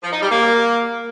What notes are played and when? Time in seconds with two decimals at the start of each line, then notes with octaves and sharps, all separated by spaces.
0.03 F3
0.12 D#4
0.22 G3
0.31 A#3